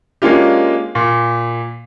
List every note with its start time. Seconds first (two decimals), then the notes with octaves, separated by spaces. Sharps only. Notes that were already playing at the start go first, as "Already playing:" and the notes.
0.22 G#3 A#3 C#4 D4 F4 G4
0.95 A#2